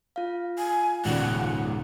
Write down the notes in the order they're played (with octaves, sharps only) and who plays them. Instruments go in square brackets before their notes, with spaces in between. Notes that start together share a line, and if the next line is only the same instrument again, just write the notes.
[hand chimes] F4 F5
[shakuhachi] G#5
[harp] D#1 [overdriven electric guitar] G#2 C#3 [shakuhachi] F#5